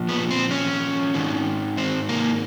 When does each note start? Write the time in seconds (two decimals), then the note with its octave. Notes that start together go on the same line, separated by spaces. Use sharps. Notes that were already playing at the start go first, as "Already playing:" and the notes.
Already playing: A#2 F3
0.09 B3
0.30 C4
0.51 C#4
1.14 G#2 D#3
1.77 C4
2.09 A#3